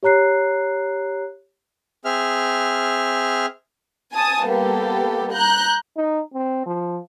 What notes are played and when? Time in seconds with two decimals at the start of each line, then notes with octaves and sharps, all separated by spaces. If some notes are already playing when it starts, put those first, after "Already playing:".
0.03 G4 C#5 A#5 F#6 C7
2.05 C4 G#4 E5 F6
4.14 G#5 A5 D#6
4.44 G3 A#3 B3 G4 A4
5.33 A#5 F#6 G6
5.96 D#4
6.34 C4
6.66 F3